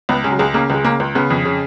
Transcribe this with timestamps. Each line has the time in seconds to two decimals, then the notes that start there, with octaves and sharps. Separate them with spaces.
0.09 C#2 B3
0.24 C#3 G#3
0.31 F#3
0.39 C#2 G#3
0.54 C#3 A#3
0.70 C#2 G#3
0.85 C#3 A#3
1.00 C#2
1.15 C#3 B3
1.30 F2
1.45 C#3